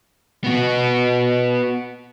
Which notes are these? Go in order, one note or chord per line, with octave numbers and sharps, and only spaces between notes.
B3 F#4